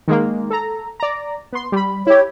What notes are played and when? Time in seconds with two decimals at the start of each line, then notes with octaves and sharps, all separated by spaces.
0.08 D#3 G#3 A#3
0.51 A4 A#5
1.00 D5 A#5
1.53 B3 C6
1.72 G3 B5
2.07 E4 G4 C#5